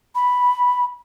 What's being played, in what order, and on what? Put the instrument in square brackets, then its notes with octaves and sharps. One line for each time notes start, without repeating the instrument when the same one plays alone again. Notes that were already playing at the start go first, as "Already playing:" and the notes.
[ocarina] B5